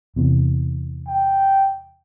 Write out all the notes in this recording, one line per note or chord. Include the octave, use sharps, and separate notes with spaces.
E2 C3
G5